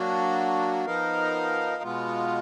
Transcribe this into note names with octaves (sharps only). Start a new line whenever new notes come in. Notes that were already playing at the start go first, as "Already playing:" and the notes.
Already playing: F#3 A#3 D4 F#4
F3 B3 D#4 A#4 F5
B2 G#3 B3 F4